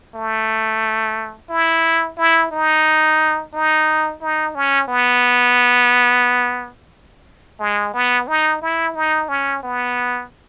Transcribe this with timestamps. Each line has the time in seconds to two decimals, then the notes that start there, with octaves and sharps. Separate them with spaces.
0.15 A3
1.50 E4
2.18 E4
2.52 D#4
3.54 D#4
4.21 D#4
4.55 C#4
4.88 B3
7.60 G#3
7.94 B3
8.28 D#4
8.62 E4
8.95 D#4
9.29 C#4
9.63 B3